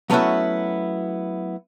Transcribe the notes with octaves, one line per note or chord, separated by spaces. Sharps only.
F#3 A3 B3 C#4 E4 F#4